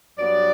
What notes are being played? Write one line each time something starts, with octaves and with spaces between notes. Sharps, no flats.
G2 F#3 B3 D5